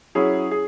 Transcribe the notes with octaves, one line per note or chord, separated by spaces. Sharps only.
F#3 C#4 E4 G#4
G#4